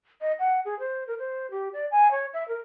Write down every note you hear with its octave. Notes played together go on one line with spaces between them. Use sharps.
D#5
F#5
G#4
C5
A#4
C5
G4
D5
G#5
C#5
E5
A#4